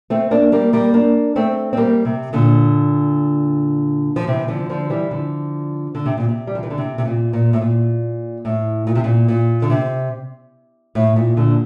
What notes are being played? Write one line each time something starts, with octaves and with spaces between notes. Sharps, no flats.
A3 C4
A#3 D4
G3 A#3
G3 A#3
A#3 D4
A3 C4
C4
G3 A#3
C3
A#2 D3
F3
C3 E3
D3 F3
D3 F3
E3 G3
D3 F3
D3
C3
A#2
C3
G3
F3
E3
D3
C3
C3
A#2
A#2
A2
A#2
A2
A#2
C3
A#2
A#2
D3
C3
A2
A#2
A#2 D3